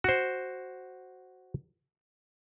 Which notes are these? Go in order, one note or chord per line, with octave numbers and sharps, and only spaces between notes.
F#4 C5